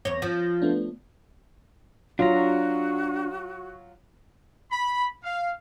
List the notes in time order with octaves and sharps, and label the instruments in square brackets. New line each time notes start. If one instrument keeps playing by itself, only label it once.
[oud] E2 C#5 [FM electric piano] A#6
[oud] F3
[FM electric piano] A3 B3 D4
[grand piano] F#3 F4 [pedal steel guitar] D4 A#5 [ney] F#4
[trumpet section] B5
F5